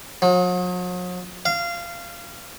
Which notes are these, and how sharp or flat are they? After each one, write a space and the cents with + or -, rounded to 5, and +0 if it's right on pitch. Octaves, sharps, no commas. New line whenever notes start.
F#3 -45
F5 -20